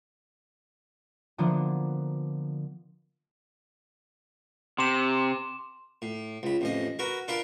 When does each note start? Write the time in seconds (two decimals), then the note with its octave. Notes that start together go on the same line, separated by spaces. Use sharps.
1.38 D3 F3 A#3 B3 D4
4.78 C3 C6 D6 E7
6.02 A2
6.43 C#2 B5
6.61 A1 F2 D#5
6.99 F#4 A#4 B4
7.28 D4 F4 A#4 B4